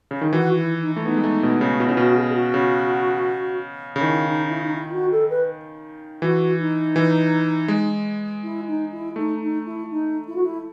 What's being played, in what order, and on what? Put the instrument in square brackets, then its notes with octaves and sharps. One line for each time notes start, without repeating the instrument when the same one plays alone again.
[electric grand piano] C#3
D#3
[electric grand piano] E3 [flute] F#4
[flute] E4
D#4
[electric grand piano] A3 [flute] E4
[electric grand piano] B3 [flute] D#4
[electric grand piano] G#3
A3
B2
C#3
[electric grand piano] B2 [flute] E4
[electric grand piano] C#3
[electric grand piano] B2 [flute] F#4
[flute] G#4
F#4
[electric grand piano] C#3
C#3
[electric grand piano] D#3 [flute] E4
[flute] D#4
E4
D#4
E4
E4
F#4
A4
B4
[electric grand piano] E3 [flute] F#4
[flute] D#4
[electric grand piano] E3
G#3
[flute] E4
D#4
E4
[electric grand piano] A3 [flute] D#4
[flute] D#4
E4
D#4
E4
F#4
E4